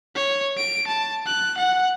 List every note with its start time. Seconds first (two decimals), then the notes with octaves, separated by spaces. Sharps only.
0.16 C#5
0.57 D7
0.88 A5
1.26 F#6
1.58 F#5